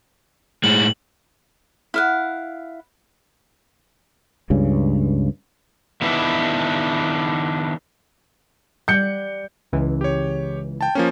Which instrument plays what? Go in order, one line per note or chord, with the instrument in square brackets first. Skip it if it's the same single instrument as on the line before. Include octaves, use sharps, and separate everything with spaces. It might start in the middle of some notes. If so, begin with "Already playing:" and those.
[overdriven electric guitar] A2 G#3 [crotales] F#7
[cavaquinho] E4 F5 F#5
[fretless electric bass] C#2 G2 C#3
[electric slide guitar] D#3 B3 D4 E4 B4
[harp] G3 F#5 [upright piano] G6 C#7
[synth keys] C#2 E3
[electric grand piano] G4 C#5
G5 A5
F3 A#3 C#4